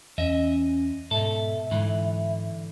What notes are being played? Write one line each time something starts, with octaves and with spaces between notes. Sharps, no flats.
E2 C#4 D#5 E5
G#2 B2 A4 E5
G#2 D3 E3